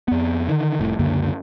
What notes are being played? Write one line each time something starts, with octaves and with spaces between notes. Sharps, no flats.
F2 B3
D3 D#3
F1 A2
C#2 F#2 D3 A#3